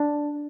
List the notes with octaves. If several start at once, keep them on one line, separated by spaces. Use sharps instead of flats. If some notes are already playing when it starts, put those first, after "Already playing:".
Already playing: D4